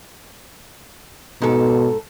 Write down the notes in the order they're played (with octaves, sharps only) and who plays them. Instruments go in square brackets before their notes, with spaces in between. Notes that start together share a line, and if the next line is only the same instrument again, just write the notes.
[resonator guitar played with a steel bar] G#2 A4 [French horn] B2